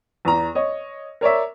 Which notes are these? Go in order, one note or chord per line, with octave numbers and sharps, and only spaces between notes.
E2 A#5
C#5 D#5
A#4 C#5 D5 E5